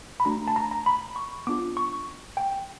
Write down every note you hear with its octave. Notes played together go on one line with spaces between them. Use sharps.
B5
A3 D4 F#4 A#5
A5
A#5
A#5
B5
C#6
B3 D4 F4 D6
C#6
G5